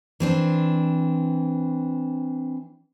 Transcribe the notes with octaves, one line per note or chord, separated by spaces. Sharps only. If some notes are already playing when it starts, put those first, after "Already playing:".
E3 C4 D4